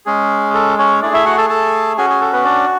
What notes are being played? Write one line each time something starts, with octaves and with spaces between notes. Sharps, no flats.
G#3 C#4 G#4
A4
C#4 C#5
A3 D4 E4 G#4 D5
E4 E5
F#4 F#5
A4 A5
A4 A5
C#4 F#4 G#4 G#5
G#4 G#5
A4
B3 B4
D4 D5